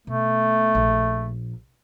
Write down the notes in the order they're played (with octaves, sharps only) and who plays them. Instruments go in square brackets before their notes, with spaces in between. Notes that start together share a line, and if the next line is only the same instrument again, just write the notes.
[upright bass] B2 [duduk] A3
[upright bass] A#1